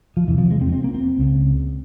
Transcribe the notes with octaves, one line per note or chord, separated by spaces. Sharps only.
F3
E2 C3 E3
F3
G#3
C4
C4
A#3
C4
C#2 C#3